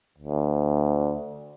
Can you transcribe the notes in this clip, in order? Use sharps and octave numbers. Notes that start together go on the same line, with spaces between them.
D2